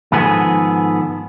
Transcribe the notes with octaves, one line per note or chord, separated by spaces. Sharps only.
G#2 D#3 F3 B3 G#4 A4